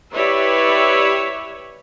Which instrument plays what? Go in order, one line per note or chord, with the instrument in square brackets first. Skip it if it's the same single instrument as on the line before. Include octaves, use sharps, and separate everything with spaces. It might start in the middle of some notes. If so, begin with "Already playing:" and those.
[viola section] E4 G4 B4 C#5 D5 E5